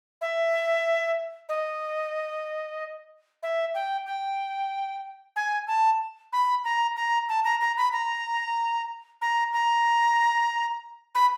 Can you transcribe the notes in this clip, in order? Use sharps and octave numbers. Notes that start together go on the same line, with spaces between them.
E5
D#5
E5
G5
G5
G#5
A5
B5
A#5
A#5
A5
A#5
A#5
B5
A#5
A#5
A#5
B5